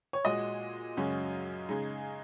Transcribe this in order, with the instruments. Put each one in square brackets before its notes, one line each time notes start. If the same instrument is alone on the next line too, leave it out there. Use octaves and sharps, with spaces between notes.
[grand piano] C#5
[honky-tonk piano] A#2 G#3 F#4 [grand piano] D#5
[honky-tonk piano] F#2 C#3 G#3 C#4 F#4
C#3 G#3 D#4 G#4